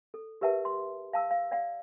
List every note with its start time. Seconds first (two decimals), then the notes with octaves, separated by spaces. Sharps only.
0.14 A4
0.41 G4 A#4 B4 E5 F#5 A5
0.65 C6
1.13 F5 A5 E6
1.31 F5
1.51 D5 F5 F#5